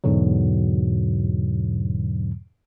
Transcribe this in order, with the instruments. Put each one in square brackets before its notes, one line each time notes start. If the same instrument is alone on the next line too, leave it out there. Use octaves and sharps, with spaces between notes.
[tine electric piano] E2 G#2 B2 D3 F#3